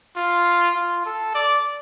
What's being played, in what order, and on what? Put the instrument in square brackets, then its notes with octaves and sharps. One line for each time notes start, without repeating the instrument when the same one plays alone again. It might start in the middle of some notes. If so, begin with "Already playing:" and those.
[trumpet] F4
F4
A4
D5